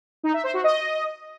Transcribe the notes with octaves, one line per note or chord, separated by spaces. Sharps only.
D#4
E5
C5
F#4
D#5